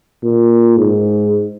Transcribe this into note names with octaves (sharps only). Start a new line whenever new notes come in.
A#2
G#2